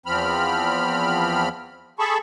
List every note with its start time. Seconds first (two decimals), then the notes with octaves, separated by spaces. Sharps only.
0.06 E2 F3 C4 B5 F6
1.99 G#4 A4 A5 B5 C#6